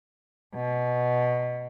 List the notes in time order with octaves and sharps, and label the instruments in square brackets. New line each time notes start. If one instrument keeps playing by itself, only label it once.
[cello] B2